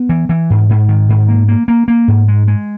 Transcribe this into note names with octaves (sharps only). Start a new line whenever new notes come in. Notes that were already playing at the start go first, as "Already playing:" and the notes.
Already playing: B3
E3
E3
G#2
G#2
D#3
G#2
A#3
A#3
A#3
A#3
G#2
G#3
G#3